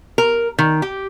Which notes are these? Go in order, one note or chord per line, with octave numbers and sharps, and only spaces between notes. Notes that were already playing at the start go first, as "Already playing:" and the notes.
A#4
D#3
G4